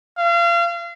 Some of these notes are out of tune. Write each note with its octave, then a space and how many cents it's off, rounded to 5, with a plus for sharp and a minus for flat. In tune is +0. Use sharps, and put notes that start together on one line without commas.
F5 -35